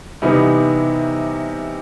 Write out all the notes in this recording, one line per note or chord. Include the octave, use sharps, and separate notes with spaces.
C3 E3 G3 B3 D#4